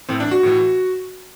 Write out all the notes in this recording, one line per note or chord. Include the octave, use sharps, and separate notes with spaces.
A2 E3 C4
D4
F#4
A2 E3